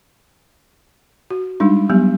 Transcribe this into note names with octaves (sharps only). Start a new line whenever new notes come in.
F#4
G3 G#3 D4 D#4
F#3 G3 B3 G4